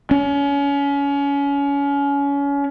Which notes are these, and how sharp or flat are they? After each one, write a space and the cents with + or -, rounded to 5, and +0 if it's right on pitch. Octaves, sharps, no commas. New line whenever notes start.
C#4 +30